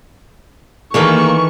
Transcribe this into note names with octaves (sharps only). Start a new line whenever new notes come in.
D#3 E3 A3 A#3 C#6